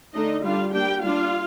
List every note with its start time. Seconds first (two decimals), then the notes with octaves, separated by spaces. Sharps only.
0.14 D3 A3 D4 D#4 D#5
0.44 G3 D4 F4 F5
0.74 G3 A#3 D4 G4 G5
1.03 G3 D4 F4 F5